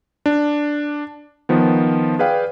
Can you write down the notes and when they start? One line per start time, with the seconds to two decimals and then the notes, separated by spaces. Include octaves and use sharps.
0.26 D4
1.49 D#3 F3 B3
2.19 G#4 B4 D5 F5 G5